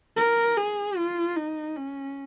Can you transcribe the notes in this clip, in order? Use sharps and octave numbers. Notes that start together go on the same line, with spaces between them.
A#4
G#4
F4
D#4
C#4